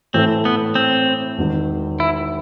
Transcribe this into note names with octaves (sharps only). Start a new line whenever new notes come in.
A2 E3 A3 C4
B3
C4
E1 E2 D#3
E4